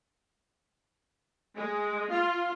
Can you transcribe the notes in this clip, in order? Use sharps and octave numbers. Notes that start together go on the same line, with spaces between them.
G#3
F4